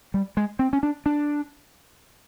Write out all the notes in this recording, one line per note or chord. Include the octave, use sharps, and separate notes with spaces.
G3
G#3
C4
C#4
D4
D4